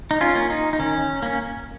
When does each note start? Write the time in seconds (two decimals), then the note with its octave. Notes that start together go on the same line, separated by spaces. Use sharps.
0.11 D#4
0.21 C#4 F4
0.35 A#3 C#4
0.50 D#4
0.73 D#4
0.79 D#3 C#4
1.22 A#3 C#4